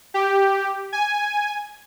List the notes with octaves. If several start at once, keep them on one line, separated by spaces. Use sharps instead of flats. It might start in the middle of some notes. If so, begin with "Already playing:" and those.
G4
G#5